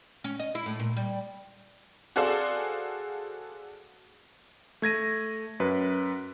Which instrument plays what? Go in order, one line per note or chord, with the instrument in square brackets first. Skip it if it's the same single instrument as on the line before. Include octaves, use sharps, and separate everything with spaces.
[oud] C#4
D#5
E4
A2
A#2
G3
[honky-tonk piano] F#4 G#4 A4 C5 D5 F5
[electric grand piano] A3 G#6 A#6 D#7
F#2 B4